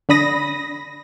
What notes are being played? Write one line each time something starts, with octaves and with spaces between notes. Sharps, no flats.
D3 D4 B5 D#6 A#6